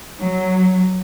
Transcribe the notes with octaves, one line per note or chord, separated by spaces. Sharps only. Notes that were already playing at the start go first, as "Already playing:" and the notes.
F#3